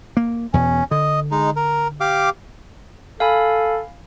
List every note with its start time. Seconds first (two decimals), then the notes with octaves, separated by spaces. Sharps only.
0.17 A#3
0.54 E2 B2 C#4
0.91 D3 D#5
1.31 G#3 D#4
1.56 A#4
2.01 G4 F5 D6
3.20 A4 F5 G#5 B5